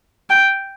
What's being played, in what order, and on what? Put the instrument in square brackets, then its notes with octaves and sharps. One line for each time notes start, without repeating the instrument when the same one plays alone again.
[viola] G5